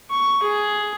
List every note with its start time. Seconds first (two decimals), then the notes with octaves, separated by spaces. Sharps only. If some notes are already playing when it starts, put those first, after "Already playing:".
0.11 C#6
0.42 G#4